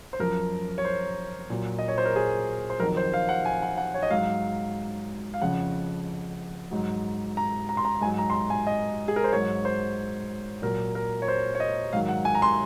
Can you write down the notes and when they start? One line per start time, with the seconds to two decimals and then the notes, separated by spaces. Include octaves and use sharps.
0.13 C5
0.19 F#2 F3 A#4
0.78 C#5
0.85 C5
1.50 A#2 F#3
1.79 D#5
1.88 C#5
1.98 C5
2.06 A#4
2.16 G#4
2.70 C5
2.80 F2 D#3 F#3 A#4
2.97 C5
3.13 F5
3.29 F#5
3.45 G#5
3.62 F#5
3.78 F#5
3.94 C#5
4.03 D#5
4.10 G#2 F#3 F5
5.34 F5
5.42 F2 C#3 F3 F#5
6.71 G#2 F#3
7.37 A#5
7.69 A#5
7.77 C6
7.85 A#5
8.01 G#2 F#3 G#5
8.18 A#5
8.30 C6
8.34 A#5
8.50 G#5
8.67 D#5
9.08 G#4
9.16 A#4
9.24 C5
9.32 G#2 F#3 C#5
9.65 C5
10.62 A#2 F#3 A#4
10.95 A#4
11.22 C#5
11.28 C5
11.55 C#5
11.60 D#5
11.93 G#2 D#3 F#3 F5
12.09 F#5
12.25 G#5
12.35 A#5
12.42 C6